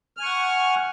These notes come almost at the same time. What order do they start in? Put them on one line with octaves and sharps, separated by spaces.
F6 G#5 C#6 F#5